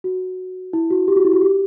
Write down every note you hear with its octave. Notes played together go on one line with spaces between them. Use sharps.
F#4
E4
F#4
G4
F#4
E4
F#4
G4